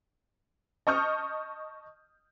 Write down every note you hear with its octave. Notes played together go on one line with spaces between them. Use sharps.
D#5 A5 C#6 D#6 F6 G6